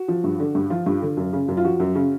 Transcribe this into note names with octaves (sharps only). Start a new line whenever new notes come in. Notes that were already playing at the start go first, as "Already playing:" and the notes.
Already playing: F#4
F3
G2
D3
G2
F3 F4
G2
D3
F#2
C#3
F#2
F4
F3 F#4
F#2
C#3